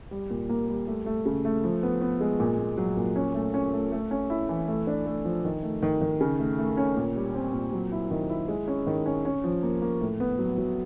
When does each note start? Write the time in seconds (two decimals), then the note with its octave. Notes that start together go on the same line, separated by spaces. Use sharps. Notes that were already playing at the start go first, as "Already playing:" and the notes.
0.11 G3
0.30 A#2
0.49 A#3
0.69 G3
0.87 A3
1.06 A3
1.26 C#3
1.45 A3
1.64 F3
1.83 B3
2.02 B3
2.21 G#3
2.40 A#2
2.59 A#2
2.78 F#3
2.97 A#2
3.16 C#4
3.35 A3
3.54 C#4
3.73 A3
3.92 A3
4.11 C#4
4.30 E4
4.49 E3
4.68 A3
4.87 D4
5.06 A3
5.25 F3
5.44 D#3
5.63 A3
5.83 D#3
6.01 D#3
6.21 C#3
6.39 A3
6.58 A3
6.77 C#4
6.96 A#2
7.15 G3
7.34 C4
7.53 A#2
7.73 F#3
7.92 E4
8.11 D#3
8.30 E4
8.48 G#3
8.68 C#4
8.87 D#3
9.06 C#4
9.25 C#4
9.44 F3
9.63 A#3
9.82 A#3
10.01 A2
10.20 B3
10.39 F#3
10.58 F#3